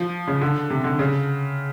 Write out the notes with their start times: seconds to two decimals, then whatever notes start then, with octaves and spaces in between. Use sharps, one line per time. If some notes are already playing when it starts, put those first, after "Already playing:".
Already playing: F3
0.27 C#3
0.41 D3
0.70 C3
0.84 D3
0.99 C#3